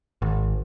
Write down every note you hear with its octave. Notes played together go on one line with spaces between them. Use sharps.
G#1